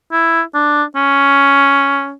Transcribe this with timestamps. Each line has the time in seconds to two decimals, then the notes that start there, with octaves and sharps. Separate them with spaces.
0.12 E4
0.54 D4
0.96 C#4